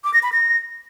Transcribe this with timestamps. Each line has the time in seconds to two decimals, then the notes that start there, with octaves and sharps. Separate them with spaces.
0.04 D6
0.14 A#6
0.23 B5
0.32 A#6